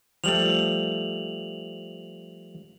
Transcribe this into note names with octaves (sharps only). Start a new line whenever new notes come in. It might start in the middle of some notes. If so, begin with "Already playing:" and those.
F3 G3 A3 F7 F#7